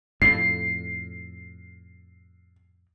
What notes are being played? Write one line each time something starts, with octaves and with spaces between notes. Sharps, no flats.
F2 A2 C7